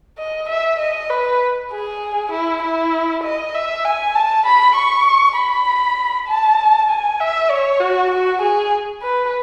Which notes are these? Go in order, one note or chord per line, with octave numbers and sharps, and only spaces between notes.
D#5
E5
D#5
B4
G#4
E4
E4
D#5
E5
G#5
A5
B5
C#6
B5
A5
G#5
E5
C#5
F#4
F#4
G#4
B4